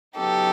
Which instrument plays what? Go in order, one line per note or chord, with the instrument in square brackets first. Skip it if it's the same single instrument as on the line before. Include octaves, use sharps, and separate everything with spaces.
[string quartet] C#3 F#3 B3 D#4 G4 A4